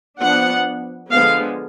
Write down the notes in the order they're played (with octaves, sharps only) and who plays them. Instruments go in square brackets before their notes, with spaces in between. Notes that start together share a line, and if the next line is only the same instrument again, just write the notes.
[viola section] F3 B3 D4 F#5
D3 F3 G#3 B3 F5